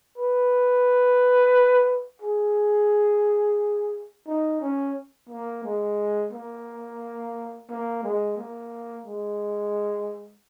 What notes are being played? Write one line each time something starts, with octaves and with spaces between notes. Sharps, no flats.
B4
G#4
D#4
C#4
A#3
G#3
A#3
A#3
G#3
A#3
G#3